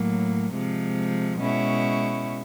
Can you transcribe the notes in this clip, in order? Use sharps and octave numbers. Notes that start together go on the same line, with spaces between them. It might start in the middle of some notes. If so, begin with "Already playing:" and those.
Already playing: A2 F#3 A#3
C3 F3 G#3
B2 G#3 C#4 E4